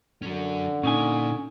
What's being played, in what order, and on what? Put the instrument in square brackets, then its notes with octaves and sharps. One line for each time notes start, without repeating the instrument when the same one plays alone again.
[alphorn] D3 [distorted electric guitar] F#3 C#4
[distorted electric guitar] A#2 [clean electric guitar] C#4 D#4 G#5